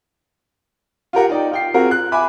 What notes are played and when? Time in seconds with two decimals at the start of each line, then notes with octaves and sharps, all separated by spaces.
1.13 F4 G4 A#4 F#5
1.29 D#4 D5 G5
1.51 F4 G5 C7
1.74 C4 F4 F#4 G#4 A#4
1.91 F#6
2.12 E5 G#5 B5 D6